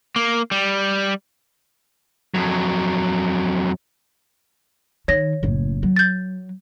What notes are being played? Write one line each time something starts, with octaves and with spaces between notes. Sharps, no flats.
A#3
G3
F2 F#3
D#3 C#5 A#6
F#1 A2
F#3
G6 A6